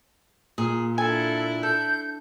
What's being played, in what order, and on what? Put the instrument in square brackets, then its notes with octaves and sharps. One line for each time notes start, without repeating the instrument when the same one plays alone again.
[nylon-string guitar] A#2 [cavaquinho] G#4
[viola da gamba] D4 E4 [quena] A4 [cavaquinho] G#5
[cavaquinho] A4 [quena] G6